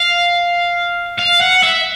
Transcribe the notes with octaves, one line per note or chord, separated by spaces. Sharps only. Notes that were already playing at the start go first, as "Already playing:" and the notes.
Already playing: F5
F5
F#5
E5